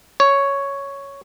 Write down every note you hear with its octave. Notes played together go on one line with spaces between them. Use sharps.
C#5